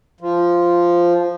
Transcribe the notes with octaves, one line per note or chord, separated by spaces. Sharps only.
F3